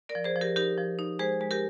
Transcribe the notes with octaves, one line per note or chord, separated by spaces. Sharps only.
A#4 D5
F3
G#4 C5
F3
G4 A#4
D#4 G4 A#4
F3
D#4
G#3 G#4 C5
G#3
G4 A#4